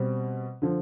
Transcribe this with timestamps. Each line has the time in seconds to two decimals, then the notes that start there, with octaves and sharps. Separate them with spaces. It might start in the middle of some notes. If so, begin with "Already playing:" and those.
Already playing: B2 G3 C4
0.62 D3 F3